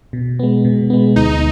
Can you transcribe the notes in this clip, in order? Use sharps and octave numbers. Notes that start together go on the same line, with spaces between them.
B2
G#3 B3
B2
G#3 B3
D2 D#4